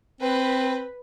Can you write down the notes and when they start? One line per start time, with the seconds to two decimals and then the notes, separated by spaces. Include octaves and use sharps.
0.21 C4 B4